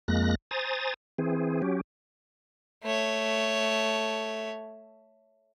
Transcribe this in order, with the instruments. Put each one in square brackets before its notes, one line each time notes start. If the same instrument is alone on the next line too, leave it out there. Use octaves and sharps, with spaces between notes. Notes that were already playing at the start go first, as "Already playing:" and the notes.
[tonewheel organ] F2 G#3 A#3 F#6 A#6
C5 G#5 A#5 D#6 A6
E3 C4 G#4
F#3 C#4 G4
[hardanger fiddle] A3 C#5